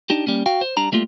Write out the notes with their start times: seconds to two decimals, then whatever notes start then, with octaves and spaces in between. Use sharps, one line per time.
0.10 D4 D#4 G4
0.27 G3 A#3 C#4
0.46 F#4 F5 G5
0.61 C5
0.77 G3 D4 A#5
0.92 G3 A3 A#3 F4